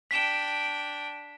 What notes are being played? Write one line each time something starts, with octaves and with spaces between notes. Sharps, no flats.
D4 G5 B6 E7